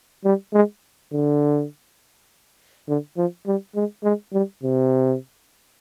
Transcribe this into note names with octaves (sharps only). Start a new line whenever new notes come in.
G3
G#3
D3
D3
F3
G3
G#3
G#3
G3
C3